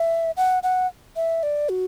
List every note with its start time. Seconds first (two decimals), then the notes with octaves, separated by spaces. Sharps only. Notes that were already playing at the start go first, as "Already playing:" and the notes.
Already playing: E5
0.37 F#5
0.63 F#5
1.16 E5
1.43 D5
1.69 F#4